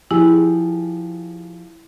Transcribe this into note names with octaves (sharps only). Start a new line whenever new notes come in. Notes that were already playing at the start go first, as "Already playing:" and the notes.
F3 E4 G4 G#4